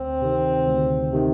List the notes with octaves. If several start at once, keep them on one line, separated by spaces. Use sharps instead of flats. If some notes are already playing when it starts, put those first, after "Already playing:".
Already playing: D2 C4
C3 D#3
D2
C3 D#3